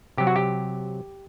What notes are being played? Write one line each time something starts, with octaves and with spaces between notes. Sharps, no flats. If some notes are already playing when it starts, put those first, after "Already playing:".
C3 F#3 G4
F#4
G4